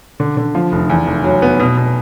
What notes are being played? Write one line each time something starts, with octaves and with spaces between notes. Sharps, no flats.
D3
D3
F3
F1
E2
F1
F#3
B3
B2
B2